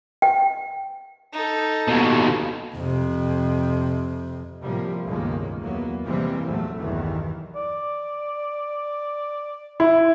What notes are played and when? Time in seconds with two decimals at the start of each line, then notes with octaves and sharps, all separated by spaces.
0.22 G5
1.33 D#4 A4
1.88 D#2 B2
2.75 F2 C3
4.61 A2 C3 F3 G3 A#3
5.05 C#2 G2 B2 D#3 G#3 A#3
5.61 E2 F#3 A#3 B3
6.06 C3 E3 G3 G#3 A#3 C4
6.47 A#1 E2 F#3 A3
6.79 B1 E2 G2 D#3 E3
7.55 D5
9.80 E4